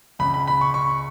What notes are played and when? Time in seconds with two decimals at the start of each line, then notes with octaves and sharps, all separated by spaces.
0.19 C#2 C#3 B5
0.34 B5
0.48 B5
0.61 C#6
0.74 C#6